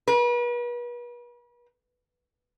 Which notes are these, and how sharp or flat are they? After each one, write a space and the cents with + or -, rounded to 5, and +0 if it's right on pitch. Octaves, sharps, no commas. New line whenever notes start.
B4 -40